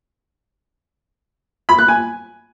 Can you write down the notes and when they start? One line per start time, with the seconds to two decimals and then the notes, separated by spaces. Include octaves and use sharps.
1.69 B5
1.79 F#6
1.88 G#5